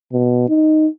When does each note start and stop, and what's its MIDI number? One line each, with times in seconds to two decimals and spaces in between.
0.13 0.46 47
0.49 0.88 63